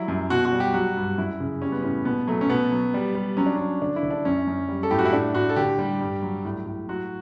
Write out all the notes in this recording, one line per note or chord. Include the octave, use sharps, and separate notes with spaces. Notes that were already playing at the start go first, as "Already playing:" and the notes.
Already playing: F#3 G3 E4
F#2
B2 F#4
F#4
G3
G4
F#3 F#4
G2
F#2 E4
C#3
G3 C#4
B3
A2 C#4
B2 B3
F#3 A3
C#4
B2 B3
F#3
G3
G3
F#3 C#4
D4
F#3 C#4
D3 D4
E4
D3
D4
F#2 C#4
F#2
G3
A4
A2 G4
F#4
E4
A2 D4
A2 F#4
A4
D3 G4
G3
G2
F#3
A2
A2
F#3 F#4